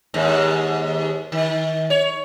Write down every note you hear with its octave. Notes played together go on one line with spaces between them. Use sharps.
D#2 G#2
D#3
C#5